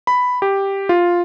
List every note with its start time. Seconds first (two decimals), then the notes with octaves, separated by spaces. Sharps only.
0.07 B5
0.42 G4
0.89 F4